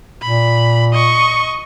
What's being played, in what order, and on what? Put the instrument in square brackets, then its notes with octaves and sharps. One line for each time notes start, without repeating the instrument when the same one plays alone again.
[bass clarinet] A#2 [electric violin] B5
[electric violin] D#5 C#6